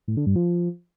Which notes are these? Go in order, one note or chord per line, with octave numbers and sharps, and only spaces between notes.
A2
D3
G2
F3